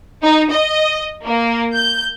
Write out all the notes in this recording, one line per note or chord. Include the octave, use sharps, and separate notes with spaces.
D#4
D#5
A#3
G6